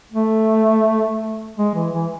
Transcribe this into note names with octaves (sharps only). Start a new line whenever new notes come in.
A3
G#3
E3
E3